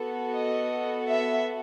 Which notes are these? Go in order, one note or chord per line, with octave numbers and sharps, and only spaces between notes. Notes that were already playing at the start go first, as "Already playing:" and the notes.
Already playing: B3 F#4 A4
D#5
E5